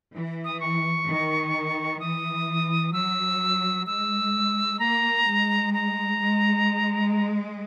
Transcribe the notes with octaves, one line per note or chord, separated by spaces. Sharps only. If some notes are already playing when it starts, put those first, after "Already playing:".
E3
D#6
C#6
D#3
E3 D#6
F#3 E6
G#3 E6
A#3 A#5
G#3
A#5
G#3